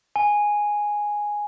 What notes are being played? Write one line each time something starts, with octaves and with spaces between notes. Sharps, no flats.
G#5